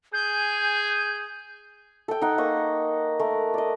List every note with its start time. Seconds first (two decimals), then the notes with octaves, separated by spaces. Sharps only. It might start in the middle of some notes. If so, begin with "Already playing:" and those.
0.13 G#4 G6
2.08 A4 G5
2.21 D#4 F#5
2.38 A#3 D#5 F#5 C#6
3.19 A3 A#4
3.54 D5 D#5